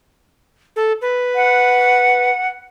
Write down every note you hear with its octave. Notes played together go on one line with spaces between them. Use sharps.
A4
B4
F#5